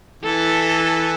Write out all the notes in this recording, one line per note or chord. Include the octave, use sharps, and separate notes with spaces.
E3 A4